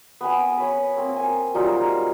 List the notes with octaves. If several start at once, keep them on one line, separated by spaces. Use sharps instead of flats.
B3 G#5
B4 C#5
A#3 C4
G#5
F#3 G3 D#4 F4